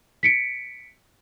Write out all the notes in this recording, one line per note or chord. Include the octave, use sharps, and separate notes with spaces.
B6 C#7 D7